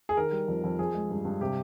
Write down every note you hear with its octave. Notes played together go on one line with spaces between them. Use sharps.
G#4
D#3 A#4
G3
F2
F2
F3 G#4
G#3
G2
G2
C3 G4